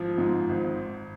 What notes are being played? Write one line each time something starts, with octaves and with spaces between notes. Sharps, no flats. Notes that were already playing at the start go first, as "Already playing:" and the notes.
Already playing: G#1 F3
G#2
G#1